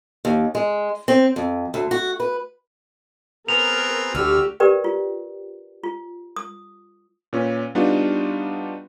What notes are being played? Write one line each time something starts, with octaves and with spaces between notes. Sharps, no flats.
D#2
G#3
C4
F2
D2
F#4
B4
B3 C4 G#4 A#4 F7
D2 G3 F#4 G4 E6 F6
G4 A#4 B4 D5 G5
F4
F4
D#6
A#2 C#4 B4
G3 B3 D4 D#4 F4 F#4